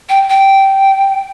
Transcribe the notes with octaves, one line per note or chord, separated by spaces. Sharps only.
G5
G5